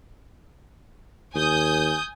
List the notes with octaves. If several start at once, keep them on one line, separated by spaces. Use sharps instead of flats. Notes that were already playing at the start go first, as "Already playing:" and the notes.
D#2 G#5 D#6 G6